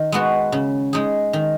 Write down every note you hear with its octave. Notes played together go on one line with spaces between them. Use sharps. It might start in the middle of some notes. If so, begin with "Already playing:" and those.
Already playing: D#3
G#3 B3 F#4
C#3
G#3 D#4 G#4
D#3